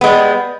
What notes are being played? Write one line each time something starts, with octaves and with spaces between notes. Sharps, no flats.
G3 G#3 B3